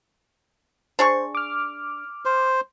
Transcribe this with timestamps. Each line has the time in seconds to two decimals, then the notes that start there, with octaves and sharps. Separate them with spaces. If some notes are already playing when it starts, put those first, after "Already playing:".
0.99 D4 G#4 C5 C#6
1.35 D6 F6
2.25 C5